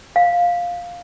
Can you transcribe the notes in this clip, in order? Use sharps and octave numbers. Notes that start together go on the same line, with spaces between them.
F5